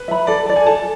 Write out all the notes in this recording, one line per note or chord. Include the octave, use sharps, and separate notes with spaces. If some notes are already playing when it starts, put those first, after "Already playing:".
Already playing: B4
E5 B5
A4 D5
D5 A5
G#5
A4 A5